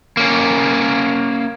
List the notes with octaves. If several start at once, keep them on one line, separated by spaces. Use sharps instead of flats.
A#3 C#4